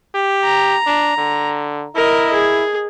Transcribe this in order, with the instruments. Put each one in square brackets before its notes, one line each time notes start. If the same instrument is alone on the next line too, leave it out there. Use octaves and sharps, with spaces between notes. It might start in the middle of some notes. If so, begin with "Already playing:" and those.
[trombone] G4
[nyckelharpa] A#5
[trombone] D4
D3
[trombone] E4 [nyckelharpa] A#4 D#5
[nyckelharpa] G#4